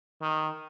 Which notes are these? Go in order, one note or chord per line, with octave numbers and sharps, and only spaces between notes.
D#3